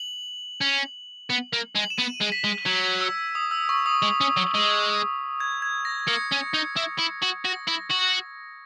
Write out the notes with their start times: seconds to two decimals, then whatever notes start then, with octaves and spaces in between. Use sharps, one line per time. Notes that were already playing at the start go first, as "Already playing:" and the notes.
Already playing: F#7
0.61 C#4
1.30 B3
1.53 A#3
1.75 G#3
1.83 F#7
1.90 E7
1.98 B3 D#7
2.21 G#3
2.32 B6
2.44 G#3
2.66 F#3 G#6
3.01 E6
3.35 D#6
3.51 E6
3.69 C#6
3.86 D#6
4.02 G#3
4.21 C#4
4.37 F#3
4.54 G#3
5.40 G#6
5.62 G#6
5.85 A#6
6.08 A#3 C#7
6.32 C#4
6.53 D#4
6.76 E4
6.99 E4
7.23 F#4
7.45 F#4 A#6
7.68 E4
7.91 F#4